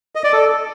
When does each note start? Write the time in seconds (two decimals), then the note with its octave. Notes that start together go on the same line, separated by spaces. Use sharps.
0.15 D#5
0.24 D5
0.33 A4